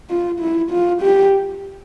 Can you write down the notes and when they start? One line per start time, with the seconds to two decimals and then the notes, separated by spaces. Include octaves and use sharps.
0.10 F4
0.40 E4
0.71 F4
1.02 G4